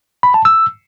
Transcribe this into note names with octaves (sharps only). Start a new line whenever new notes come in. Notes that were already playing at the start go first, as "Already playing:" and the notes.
B5
A5
E6